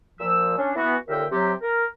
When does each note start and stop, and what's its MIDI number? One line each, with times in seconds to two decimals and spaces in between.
0.20 0.56 46
0.20 0.56 53
0.20 0.56 88
0.58 0.71 61
0.58 0.71 62
0.75 0.96 52
0.75 0.96 59
0.75 0.96 66
1.08 1.25 39
1.08 1.25 46
1.08 1.25 50
1.08 1.25 70
1.08 1.25 76
1.08 1.25 79
1.31 1.53 48
1.31 1.53 54
1.31 1.53 67
1.62 1.85 70